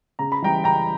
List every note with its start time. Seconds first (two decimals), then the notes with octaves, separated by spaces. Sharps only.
0.19 C#3 A#5
0.32 B5
0.42 E3 G3 G5 A#5
0.64 C#3 G5 A#5